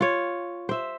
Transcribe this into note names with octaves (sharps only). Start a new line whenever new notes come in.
F4 C#5
C5 E5